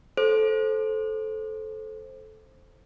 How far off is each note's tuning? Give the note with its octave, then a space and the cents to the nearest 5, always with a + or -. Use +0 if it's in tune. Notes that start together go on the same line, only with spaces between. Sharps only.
A4 -15 C5 +10